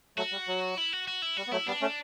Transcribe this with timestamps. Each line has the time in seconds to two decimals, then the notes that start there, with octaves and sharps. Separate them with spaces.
0.17 F#3 A3 F#4
0.32 G3
0.48 F#3
0.77 E4
0.92 F#4
1.08 F#4
1.22 E4
1.37 G3 F#4
1.47 B3
1.52 F#3 A3 E4
1.67 G3 B3 D4
1.81 A3 C#4